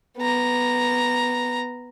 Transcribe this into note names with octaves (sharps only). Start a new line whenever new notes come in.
B3 A#5